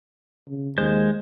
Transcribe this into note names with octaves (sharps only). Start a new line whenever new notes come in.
C#3
D#2 G#3 C5 G6